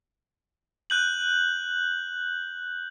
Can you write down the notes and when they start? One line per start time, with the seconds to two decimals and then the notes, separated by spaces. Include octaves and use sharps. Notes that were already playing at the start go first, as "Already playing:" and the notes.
0.90 F#6 G6 F#7